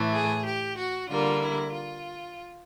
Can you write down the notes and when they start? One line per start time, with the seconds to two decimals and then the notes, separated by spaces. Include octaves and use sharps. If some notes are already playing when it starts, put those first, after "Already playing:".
Already playing: A2 E3 A3
0.13 G#4
0.46 G4
0.77 F#4
1.09 D3 G3 A#3 F4
1.42 E4
1.73 F4